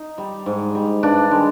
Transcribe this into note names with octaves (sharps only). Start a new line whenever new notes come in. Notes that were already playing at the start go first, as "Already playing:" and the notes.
Already playing: D#4
G3
G#2
G3
G2 D4
D#3 G#3